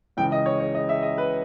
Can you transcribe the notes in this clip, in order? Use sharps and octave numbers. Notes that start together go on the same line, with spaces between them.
C#2 C#3 E3 G5
D#5
C#5
C#5
D#5
E5
D#5
B4